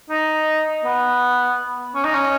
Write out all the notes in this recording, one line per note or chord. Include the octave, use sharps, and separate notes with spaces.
D#4
B3
C#4
D#4
C#4